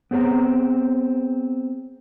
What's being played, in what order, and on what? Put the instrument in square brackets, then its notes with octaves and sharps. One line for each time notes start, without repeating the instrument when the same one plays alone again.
[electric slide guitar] B3 C4 G#4 C#5 A#5